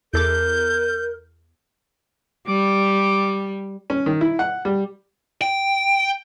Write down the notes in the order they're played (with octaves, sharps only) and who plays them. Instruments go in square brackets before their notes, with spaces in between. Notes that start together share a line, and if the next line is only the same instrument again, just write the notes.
[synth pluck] E2 A4 D6 [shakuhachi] A#4 [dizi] G6
[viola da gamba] G3 [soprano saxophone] D6
[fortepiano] C#4
D#3
E4
F#5
G3
[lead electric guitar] G5